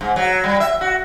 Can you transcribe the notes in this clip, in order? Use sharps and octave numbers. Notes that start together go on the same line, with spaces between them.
G#2
F#3
G3
E5
F#4